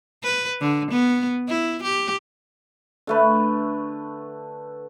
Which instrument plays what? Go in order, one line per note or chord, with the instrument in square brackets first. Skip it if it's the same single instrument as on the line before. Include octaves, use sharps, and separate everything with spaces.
[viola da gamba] B4
D3
B3
E4
G4
[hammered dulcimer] D3 A3 B4